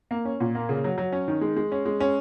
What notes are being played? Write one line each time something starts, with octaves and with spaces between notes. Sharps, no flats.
A#3
C#4
A#2
A#3
C#3
F#3
F#3
C#4
D#3
G#3
G#3
C#4
G#3
C#4